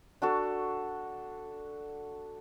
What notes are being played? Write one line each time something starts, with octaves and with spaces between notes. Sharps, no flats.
D4 F#4 A4